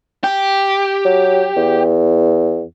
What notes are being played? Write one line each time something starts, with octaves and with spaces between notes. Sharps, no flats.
G4
F#3
E2